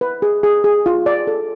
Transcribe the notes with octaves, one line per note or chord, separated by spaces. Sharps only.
B4
G#4
G#4
G#4
F4
D5
A4